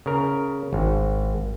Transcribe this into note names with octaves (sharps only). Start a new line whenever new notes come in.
C#3 A#4
G#1